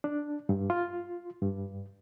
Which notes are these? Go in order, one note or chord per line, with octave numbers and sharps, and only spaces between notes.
D4
G2
F4
G2